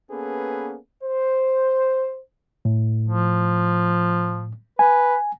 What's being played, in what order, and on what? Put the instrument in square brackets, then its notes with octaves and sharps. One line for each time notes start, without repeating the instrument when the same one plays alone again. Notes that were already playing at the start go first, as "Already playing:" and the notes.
[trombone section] A#3 B3 C#4 G#4 A4 B4
C5
[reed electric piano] A2
[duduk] F3
[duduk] B4 [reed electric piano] G#5